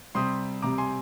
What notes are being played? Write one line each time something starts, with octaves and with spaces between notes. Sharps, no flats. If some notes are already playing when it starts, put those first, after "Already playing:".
C3 G3 C4 C6 D#6
C3 G3 C4 A#5 D6
G#5 C6